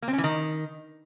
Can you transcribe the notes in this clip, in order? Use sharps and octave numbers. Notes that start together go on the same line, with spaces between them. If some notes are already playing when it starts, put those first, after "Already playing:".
A#3
C4
C#4
E3
D#3